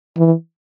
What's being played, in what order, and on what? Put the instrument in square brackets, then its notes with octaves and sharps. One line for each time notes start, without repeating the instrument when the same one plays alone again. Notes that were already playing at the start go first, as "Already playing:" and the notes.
[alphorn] E3